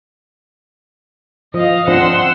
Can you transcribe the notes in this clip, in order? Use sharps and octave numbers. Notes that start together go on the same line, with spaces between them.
F3 D#5 F5
F3 C4 D4 F#5 C6 E6